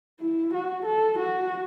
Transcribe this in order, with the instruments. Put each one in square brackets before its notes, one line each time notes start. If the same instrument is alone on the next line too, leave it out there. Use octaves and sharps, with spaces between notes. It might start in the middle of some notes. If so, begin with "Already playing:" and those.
[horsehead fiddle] E4
F#4
A4
F#4